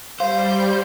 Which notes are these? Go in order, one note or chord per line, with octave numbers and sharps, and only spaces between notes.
G3 C5 F5